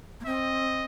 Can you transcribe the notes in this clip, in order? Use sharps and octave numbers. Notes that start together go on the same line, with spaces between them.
A#3
C4 D#5